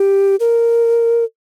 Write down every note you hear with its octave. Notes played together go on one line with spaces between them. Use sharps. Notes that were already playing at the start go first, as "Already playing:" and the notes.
Already playing: G4
A#4